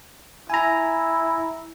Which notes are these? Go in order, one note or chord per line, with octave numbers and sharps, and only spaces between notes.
E4 G#5 A#5